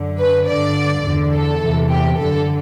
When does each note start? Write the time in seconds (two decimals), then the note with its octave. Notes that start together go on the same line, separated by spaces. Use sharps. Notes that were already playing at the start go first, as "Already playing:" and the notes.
Already playing: F#2 D3
0.19 B4
0.47 G2 D3 D5
1.05 E2 D3
1.32 A4
1.61 E2 C3 E3
1.90 G4
2.18 F#2 D3 A4